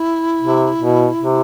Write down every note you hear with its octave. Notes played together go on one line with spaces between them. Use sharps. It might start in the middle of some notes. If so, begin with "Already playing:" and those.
Already playing: E4
C3
B2
C3